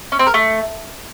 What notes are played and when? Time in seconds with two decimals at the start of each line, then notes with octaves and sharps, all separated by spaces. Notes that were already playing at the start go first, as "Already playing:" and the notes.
0.12 C#4
0.19 C4
0.27 A#4
0.34 A3